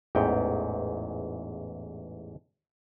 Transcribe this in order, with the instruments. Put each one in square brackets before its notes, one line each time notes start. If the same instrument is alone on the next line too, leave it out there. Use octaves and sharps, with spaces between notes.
[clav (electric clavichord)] A1 E2 G#2 G5